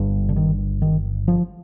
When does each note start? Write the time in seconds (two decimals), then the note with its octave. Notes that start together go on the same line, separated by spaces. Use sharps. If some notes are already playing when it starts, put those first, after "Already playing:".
Already playing: G1 G2
0.29 D3
0.36 D#3
0.82 D#3
1.28 F3